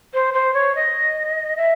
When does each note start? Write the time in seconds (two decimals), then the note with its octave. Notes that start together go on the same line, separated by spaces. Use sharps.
0.13 C5
0.33 C5
0.53 C#5
0.75 D#5
1.57 E5